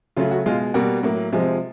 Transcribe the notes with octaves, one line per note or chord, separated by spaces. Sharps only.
C#3 F#3 A3 F4
F#4
B2 G#3 F4
B2 G3 A#3 F#4
A2 F#3 A#3
C3 F3 G#3